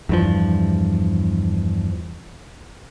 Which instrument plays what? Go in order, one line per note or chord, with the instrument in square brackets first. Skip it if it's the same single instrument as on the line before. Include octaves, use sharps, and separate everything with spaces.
[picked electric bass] E2 G2 F3